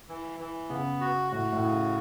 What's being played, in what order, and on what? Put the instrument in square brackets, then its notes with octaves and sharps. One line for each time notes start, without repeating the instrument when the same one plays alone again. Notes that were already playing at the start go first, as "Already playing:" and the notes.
[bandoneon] E3
E3
[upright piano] C#3 [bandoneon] B3
[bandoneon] F#4
[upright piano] A2 [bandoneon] F#4
[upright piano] A2
[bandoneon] C#3